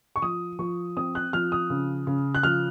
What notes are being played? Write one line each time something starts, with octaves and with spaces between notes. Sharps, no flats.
C#6
F3 D#6
F3 C#6
C4 D#6
F#6
F3 F6
D#6
C#3
C#3
F#6
F3 F6